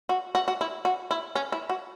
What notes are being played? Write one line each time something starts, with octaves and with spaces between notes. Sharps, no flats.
F#4
F#4
F#4
E4
F#4
E4
C#4
E4
F#4